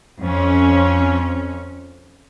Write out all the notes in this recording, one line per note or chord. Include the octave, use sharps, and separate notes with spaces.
F2 C#4